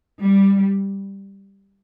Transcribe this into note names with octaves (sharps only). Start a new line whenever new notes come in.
G3